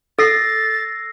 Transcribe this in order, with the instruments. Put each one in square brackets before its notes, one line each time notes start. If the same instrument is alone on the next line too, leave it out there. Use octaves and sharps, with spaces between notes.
[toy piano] A4 [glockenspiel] E6 A#6 C7 [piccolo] A6